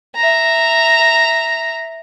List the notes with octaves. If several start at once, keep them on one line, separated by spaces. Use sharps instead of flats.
E5 A#5